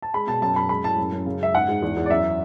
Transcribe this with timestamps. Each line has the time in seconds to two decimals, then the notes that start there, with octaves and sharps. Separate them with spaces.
0.02 A5
0.14 G#3 B5
0.27 B2 A5
0.42 F#2 A5
0.55 F#2 B5
0.69 G#3 B5
0.84 A2 A5
0.98 F#2
1.12 F#2
1.26 C#3
1.40 G#3 E5
1.54 G#2 F#5
1.68 G#2
1.82 E2
1.96 E2
2.06 D5
2.10 F#2 E5